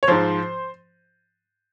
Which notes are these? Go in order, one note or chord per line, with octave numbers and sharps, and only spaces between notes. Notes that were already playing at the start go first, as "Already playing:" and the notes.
C#5
G#2 F3 C5